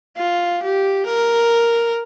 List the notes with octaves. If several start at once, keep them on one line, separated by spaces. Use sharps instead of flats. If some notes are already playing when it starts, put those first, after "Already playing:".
F4
G4
A#4